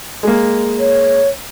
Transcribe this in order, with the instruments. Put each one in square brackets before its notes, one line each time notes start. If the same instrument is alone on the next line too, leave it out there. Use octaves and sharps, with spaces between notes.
[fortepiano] G#3 A#3
[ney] C#5